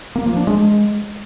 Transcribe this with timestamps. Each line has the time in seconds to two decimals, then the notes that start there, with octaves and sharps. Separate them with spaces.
0.16 A#3
0.26 F3
0.37 D4
0.47 G#3